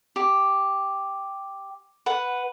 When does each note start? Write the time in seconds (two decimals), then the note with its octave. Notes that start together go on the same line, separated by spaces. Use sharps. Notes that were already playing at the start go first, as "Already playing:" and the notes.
0.16 G4
2.06 B4 F#5